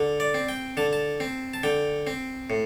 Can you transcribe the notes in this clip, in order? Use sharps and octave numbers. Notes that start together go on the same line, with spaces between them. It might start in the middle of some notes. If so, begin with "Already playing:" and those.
Already playing: D3
D5
C4
G5
D3 A5
A5
C4
A5
D3 G5
C4
A2